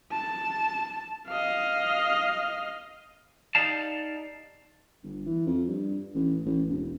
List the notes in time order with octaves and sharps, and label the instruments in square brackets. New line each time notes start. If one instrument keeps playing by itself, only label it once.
[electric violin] A5
D#5 F5
[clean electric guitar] D#4 F#4 G4 D5 F5 A5
[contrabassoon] G1
E3
F2
G2
A1
A1
E1